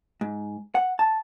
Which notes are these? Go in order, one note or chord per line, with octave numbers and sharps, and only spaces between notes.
G#2
F#5
A5